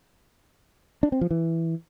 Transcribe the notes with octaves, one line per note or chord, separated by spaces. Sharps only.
D4
C4
F3
E3